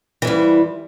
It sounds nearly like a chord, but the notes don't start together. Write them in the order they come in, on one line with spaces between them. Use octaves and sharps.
E3 F2 G3